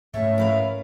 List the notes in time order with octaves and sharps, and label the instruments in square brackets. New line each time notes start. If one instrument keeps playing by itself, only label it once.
[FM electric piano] G#2 A3 [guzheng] C#4 A4 [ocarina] E5
[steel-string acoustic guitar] A#4 B4 F5